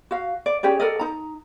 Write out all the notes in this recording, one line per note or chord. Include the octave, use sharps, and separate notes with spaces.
F#4 F5
D5
C#4 G4 G#4 D5
A4 A#4 D5 D#5
D#4 A#5